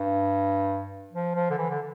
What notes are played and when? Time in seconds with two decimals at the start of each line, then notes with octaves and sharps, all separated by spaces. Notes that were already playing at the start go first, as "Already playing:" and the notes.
Already playing: G2
1.13 F3
1.35 F3
1.50 D3
1.58 E3
1.70 D3